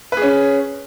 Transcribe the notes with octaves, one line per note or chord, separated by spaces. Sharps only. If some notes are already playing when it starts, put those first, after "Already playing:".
C#4 G#4 B4